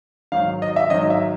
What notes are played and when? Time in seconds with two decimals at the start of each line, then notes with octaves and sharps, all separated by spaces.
0.32 G#2 D#3 F#3 F5
0.62 D#5
0.76 E5
0.90 G#2 D#3 F#3 D#5
1.10 E5